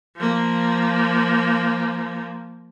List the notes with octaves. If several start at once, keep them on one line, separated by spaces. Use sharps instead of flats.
F3 A#3